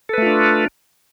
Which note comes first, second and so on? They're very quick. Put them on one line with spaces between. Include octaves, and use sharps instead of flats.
A4 B4 A3 F4 D4